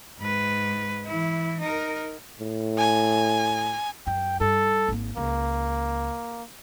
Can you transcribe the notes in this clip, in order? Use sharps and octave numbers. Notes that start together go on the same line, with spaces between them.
G#2 B4
E3 E4
D#4 A#4
A2
G#5
F#2 G5
G2 A4
G#1 A#3
C#2 A#3